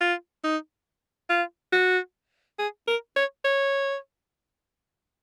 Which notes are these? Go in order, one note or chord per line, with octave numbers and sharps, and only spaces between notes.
F4
D#4
F4
F#4
G#4
A#4
C#5
C#5